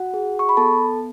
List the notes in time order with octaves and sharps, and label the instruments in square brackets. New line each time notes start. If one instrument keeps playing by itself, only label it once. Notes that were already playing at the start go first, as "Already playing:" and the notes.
Already playing: [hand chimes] F#4 F#5
G#4
C#6
B5
B3 A4 A5